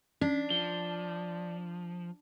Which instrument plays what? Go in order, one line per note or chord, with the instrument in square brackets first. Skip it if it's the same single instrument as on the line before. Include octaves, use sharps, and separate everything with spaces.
[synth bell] C#4 [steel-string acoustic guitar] D4
[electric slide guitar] F3 [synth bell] G7